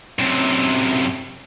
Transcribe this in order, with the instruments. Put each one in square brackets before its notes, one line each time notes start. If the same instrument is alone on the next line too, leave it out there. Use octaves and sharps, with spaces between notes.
[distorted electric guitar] F#2 C3